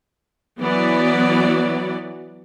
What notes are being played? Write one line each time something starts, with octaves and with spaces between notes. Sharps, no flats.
E3 F#3 B3 D5